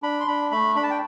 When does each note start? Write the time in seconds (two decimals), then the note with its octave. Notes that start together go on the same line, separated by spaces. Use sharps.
0.03 D4 B5
0.20 C6
0.27 D4 B5
0.51 A3 B5
0.76 D4 B5
0.83 A5
0.90 G5